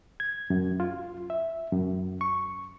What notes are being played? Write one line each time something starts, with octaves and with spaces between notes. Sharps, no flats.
G#6
F#2
F4
E5
F#2
C#6